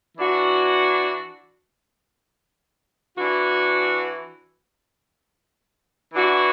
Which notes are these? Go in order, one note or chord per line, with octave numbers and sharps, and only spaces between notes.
E3 D4 F#4
E3 D4 F#4
E3 D4 F#4